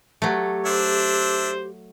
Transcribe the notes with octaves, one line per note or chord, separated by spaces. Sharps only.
F#3 A3 G4
D4 C5 E5